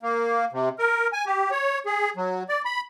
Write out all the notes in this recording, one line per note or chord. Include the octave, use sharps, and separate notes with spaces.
A#3
C3
A#4
G#5
G4
C#5
G#4
F#3
D5
B5